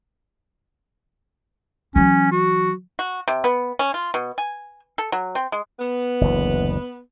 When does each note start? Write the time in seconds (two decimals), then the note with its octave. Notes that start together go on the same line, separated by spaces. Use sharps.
1.96 E3 F#3 C#4
2.32 F#4
2.99 F#4
3.28 C3
3.44 B3
3.79 C#4
3.94 F4
4.14 B2
4.38 G#5
4.98 A4
5.12 F#3
5.35 C4
5.52 G#3
5.80 B3
6.21 F#1 D2 E3